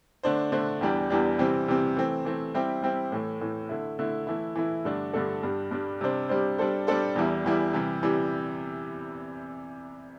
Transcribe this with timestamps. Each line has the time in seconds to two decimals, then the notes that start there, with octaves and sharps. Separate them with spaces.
0.23 D3 A3 D4 C5
0.52 D3 A3 D4 C5
0.81 E2 E3 G3 D4 G4
1.10 E2 E3 G3 D4 G4
1.38 C3 E3 G3 C4
1.68 C3 E3 G3 C4
1.96 E3 A3 C4
2.25 E3 A3 C4
2.54 G3 C4 E4 G4
2.82 G3 C4 E4 G4
3.12 A2 E3 A3
3.41 A2 E3 A3
3.69 D3 A3 E4
3.99 D3 A3 E4
4.27 E3 A3 E4
4.55 E3 A3 E4
4.85 G2 D3 A3 D4 A4
5.14 G2 D3 A3 D4 A4
5.43 G2 G3 D4
5.71 G2 G3 D4
6.01 C3 G3 D4 C5
6.29 C3 G3 D4 C5
6.58 G3 D4 A4 C5
6.87 G3 D4 A4 C5
7.16 E2 E3 G3 E4
7.44 E2 E3 G3 E4
7.73 C3 E3 G3
8.03 C3 E3 G3